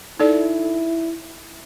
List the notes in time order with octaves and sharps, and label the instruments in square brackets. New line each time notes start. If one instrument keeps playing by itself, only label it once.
[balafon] D#4 A4 D5 [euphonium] E4